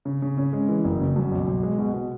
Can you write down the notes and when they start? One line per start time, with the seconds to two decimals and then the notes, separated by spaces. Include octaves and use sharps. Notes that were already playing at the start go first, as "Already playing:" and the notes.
0.05 C#3
0.22 C#3
0.37 C#4
0.53 G#3
0.69 E3
0.84 F#1
1.00 C#3
1.16 F#2
1.32 B1
1.47 B1
1.63 G#3
1.79 B2
1.94 B2